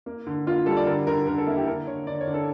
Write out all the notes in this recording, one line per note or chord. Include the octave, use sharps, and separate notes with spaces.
A#3
D3
A#3 F4
G3 A4
D5
D3 A#4
D3 A#4
D3 A#4
A4
A#3 E4
G4
D3 A#4
D3 C#5
D3 D5
C#5
D3
A4